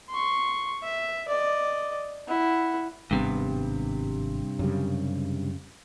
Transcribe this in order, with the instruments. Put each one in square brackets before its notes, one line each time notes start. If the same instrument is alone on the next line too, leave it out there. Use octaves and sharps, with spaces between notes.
[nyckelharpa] C6 C#6
E5
D5 D#5
E4 F#5
[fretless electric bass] G#1 G3 B3 [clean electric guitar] G2 C3
[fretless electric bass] F#2 C#3 G3